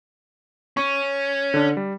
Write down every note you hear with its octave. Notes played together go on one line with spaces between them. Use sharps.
C#4 C#6
D3 D4
G3